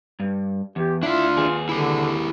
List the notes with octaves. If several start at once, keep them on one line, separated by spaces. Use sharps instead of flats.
G2
E2 G4
D4 E4 F4 E5
D#2 G#4
D3 E4 G4